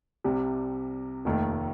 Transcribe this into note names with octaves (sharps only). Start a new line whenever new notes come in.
C2 C3 G3
F1 D#2 D#3 A3